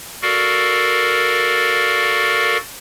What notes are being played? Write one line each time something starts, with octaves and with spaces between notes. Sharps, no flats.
F#4 A4 A#4 D5 F5